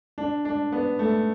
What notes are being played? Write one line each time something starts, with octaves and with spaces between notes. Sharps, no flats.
D4
D4
B3
A3